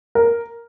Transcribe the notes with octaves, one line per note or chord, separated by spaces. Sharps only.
A#4